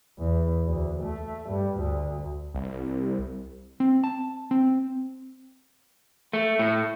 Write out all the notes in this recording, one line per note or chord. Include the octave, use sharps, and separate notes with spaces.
E2
D2
A3
G2
D2
C2
C4
A5
C4
A3
A2